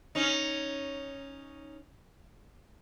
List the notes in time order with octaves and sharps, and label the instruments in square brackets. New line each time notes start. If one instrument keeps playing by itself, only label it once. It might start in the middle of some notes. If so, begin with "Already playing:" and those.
[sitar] C#4 D#4